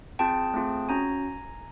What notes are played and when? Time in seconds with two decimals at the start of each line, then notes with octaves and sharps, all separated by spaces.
0.19 C4 F4 G#4 G5 A5
0.54 A3 C4 F4 G#4
0.89 C#4 F#4 G#5 A#5